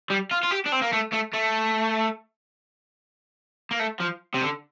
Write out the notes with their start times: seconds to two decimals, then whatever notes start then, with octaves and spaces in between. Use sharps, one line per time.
0.10 G3
0.31 F4
0.43 F4
0.51 G4
0.66 D4
0.72 C4
0.81 A#3
0.93 A3
1.13 A3
1.33 A3
3.71 A#3
3.80 A3
4.00 F3
4.34 C3
4.42 D3